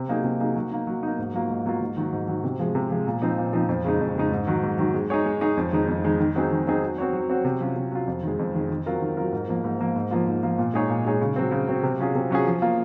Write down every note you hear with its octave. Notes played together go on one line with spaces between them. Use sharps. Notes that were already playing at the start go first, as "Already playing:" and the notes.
Already playing: C3
F#3 A#3 D#4 G#4
C3
F#3 A#3 D#4 G#4
F#3
A#3 D#4
F#3
A#3 D#4
G#2
F#3 A#3 F4
G#2
F#3 A#3 F4
G#2
D#3 F#3
G#2
D#3 F#3
C3
F3 G#3
C3
F3 G#3
A#2
F3 C4 D#4
A#2
F3 C4 D#4
F2
C#3 G#3 D#4
F2
C#3 G#3 D#4
G#2
D#3 F#3
G#2
D#3 F#3
G#3
D#4 G#4 C#5
G#3
D#4 G#4 C#5
F2
D#3 G#3 D#4
F2
D#3 G#3 D#4
D#3
F#3 C4 D#4 G#4
D#3
F#3 C4 D#4 G#4
F#3
C4 F#4 C#5
F#3
C4 F#4 C#5
C3
F#3 C#4 F4
C3
F#3 C#4 F4
F2
D#3 G#3
F2
D#3 G#3
D#3
F#3 C4 F4 A#4
D#3
F#3 C4 F4 A#4
G#2
F3 A#3
G#2
F3 A#3
G#2
F3 A#3 F4
G#2
F3 A#3 F4
A#2
G#3 D#4 G#4 C#5
A#2
G#3 D#4 G#4 C#5
C#3
F#3 C4
C#3
F#3 C4
C3
F#3 C#4 F4 G#4
C3
F#3 C#4 F4 G#4
F3
A#3 F4